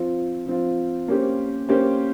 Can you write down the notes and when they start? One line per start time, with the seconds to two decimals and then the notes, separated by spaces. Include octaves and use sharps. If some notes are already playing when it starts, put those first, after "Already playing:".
Already playing: F3 C4 F4
0.46 F3 C4 F4
1.08 A#3 C#4 G4 C5
1.69 A#3 C#4 G4 C5